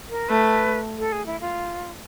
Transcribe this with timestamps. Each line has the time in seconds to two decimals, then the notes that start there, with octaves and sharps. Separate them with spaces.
0.10 A#4
0.29 A3 B4
0.99 A4
1.12 G#4
1.26 E4
1.41 F4